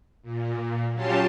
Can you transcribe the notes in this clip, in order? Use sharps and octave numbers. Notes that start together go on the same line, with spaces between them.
A#2
F#3 C#4 F4 G4 A5 C6